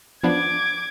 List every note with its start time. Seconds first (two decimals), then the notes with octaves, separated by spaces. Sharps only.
0.23 F3 B3 D4 D6 G#6